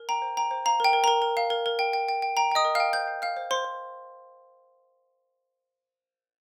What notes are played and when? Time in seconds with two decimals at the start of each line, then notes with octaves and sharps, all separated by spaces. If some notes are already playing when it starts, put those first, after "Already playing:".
Already playing: A#4
0.09 G5 A#5
0.22 C5
0.37 G5 A#5
0.51 C5
0.65 F5 A#5
0.80 A#4
0.84 G5
0.93 A#4
1.04 A#4 A#5
1.22 A#4
1.37 F5
1.50 A#4
1.66 A#4
1.79 G5
1.93 G5
2.09 G5
2.22 G5
2.37 G5 A#5
2.51 D#5 G5 D#6
2.65 A#4
2.75 F5 G5 F6
2.93 C5 G5 G6
3.08 F5
3.22 F5 F6
3.37 C5
3.51 C5 C6
3.65 C5